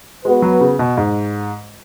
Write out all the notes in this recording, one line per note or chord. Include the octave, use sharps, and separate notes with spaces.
G#3 B3 F#4 B4
F#3
C#3
B2
G#2